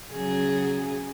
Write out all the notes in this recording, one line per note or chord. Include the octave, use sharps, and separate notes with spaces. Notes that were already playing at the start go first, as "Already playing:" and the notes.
C#3 F#3 G#4